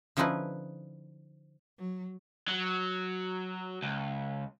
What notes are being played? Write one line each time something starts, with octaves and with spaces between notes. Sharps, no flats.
D3 F3 C#4 D#4 E4 B4
F#3
F#3
C#2